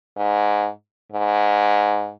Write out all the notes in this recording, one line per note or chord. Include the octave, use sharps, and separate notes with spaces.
G#2
G#2